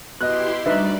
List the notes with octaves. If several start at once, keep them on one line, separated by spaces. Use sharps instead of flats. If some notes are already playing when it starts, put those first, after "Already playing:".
B2 E4 G4 D#5 C6 F#6
D2 G3 D#4 B4 D5 E5